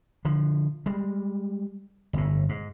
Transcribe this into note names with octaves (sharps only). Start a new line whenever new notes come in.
D3 F3
G3 G#3
G1 A2
G#2